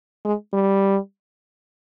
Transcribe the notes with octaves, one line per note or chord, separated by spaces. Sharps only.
G#3
G3